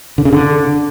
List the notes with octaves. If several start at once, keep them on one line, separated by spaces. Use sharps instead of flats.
D3
C#3
D3